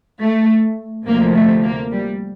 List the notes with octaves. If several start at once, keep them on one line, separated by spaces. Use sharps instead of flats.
A3
D2 C3 F3 A#3
A3
A#3
G3